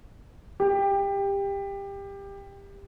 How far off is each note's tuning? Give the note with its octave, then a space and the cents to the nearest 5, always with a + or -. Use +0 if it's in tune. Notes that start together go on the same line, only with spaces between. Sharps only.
G4 +20